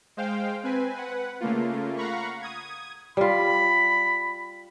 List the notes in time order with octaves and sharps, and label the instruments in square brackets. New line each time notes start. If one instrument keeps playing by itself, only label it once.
[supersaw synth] G#3 C5 F5 G5
C4 B4 G#5
B4 F#5
C#3 A3 A#3 F4
F5 F#5 A#5 B5 C#6
D#6 G#6
[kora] G3 F4 [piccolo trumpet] B5